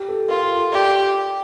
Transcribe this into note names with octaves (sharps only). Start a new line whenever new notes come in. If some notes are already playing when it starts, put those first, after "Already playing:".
Already playing: G4
A4
F4 A#4
A4
G4 D5